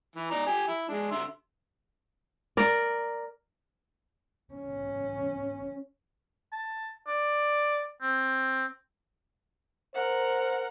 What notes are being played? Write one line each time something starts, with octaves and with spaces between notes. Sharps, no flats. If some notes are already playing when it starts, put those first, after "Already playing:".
E3
D5 D#5 A#5
G4 G#5
E4
G#3 D4
D3 E5 C6
A#4 D5
C#4
A5
D5
C4
A#4 C5 F#5